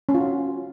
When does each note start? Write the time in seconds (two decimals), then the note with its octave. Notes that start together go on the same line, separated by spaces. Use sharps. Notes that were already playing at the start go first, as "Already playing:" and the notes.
0.09 C#4
0.15 F4
0.20 F#4